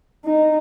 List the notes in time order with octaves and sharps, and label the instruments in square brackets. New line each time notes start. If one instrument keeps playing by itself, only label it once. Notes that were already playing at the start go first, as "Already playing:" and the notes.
[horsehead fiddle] D#4